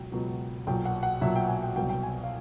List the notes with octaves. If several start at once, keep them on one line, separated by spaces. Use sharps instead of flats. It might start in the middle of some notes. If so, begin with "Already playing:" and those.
Already playing: C#2 B2 F#3 G5
C#2 B2 F#3
B1 A#2 F#3 G5
F#5
F#5
B1 A#2 F#3 E5
G5
G#5
G5
C2 B2 F#3 G5
G5
G#5
F5